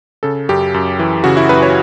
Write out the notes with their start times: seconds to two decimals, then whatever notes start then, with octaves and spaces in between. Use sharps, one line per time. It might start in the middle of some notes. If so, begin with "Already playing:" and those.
0.23 C#3 A4
0.49 F#2 G4
0.74 F#2
0.99 E3
1.24 C#3 F#4
1.37 E4
1.49 F#2 B4
1.62 C#5